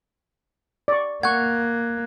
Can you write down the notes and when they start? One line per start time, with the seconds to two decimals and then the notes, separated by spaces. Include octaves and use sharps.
0.88 D5 C#6
1.23 A#3 F#5 C#6 F#6 G#6